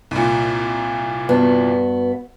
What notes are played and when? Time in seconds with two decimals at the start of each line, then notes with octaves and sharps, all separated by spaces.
0.11 C2 A#2
1.29 G2 B3 F#4